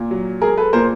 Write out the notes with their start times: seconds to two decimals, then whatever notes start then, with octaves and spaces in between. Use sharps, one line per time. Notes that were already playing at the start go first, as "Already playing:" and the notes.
Already playing: A#2
0.11 F#3
0.41 G#3 G#4 A#4
0.57 A4 B4
0.73 A#2 A#4 C5